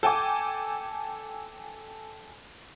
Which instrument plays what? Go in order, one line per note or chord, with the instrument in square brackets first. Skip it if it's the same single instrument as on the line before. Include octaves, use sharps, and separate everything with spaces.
[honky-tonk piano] A4 G5 G#5 D6